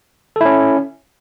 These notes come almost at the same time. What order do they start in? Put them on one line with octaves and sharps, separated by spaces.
A4 E4 C#4